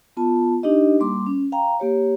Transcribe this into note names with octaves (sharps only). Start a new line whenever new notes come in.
B3 F4 A5
D4 D#4 G4 D#5
G3 A#3 C6 D6
C#4
F5 G5 A#5
A#3 G4 C#5